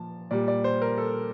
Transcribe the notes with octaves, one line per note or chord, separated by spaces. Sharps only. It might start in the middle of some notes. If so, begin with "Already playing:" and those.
Already playing: A#2 F3 A5
A#2 G3 D5
D5
C5
A#4
A4